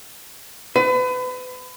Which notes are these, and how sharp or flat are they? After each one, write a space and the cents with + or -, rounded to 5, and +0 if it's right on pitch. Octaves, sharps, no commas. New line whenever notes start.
B4 +35